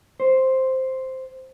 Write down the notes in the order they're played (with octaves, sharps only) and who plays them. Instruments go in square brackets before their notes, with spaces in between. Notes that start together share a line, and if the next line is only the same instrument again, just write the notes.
[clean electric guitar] C5